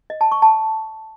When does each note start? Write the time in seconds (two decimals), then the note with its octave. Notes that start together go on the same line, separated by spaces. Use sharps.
0.10 D#5
0.21 A5
0.32 C#6
0.42 A5